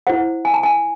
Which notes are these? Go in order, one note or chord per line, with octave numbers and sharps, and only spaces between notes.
E4 C5 F#5
G#5
A5
G#5